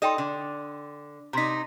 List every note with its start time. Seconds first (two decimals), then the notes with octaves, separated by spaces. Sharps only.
0.02 D#4 A4 D5 D#5 G5 C6
0.18 D3
1.33 C3 D#4 A#5 C6 B6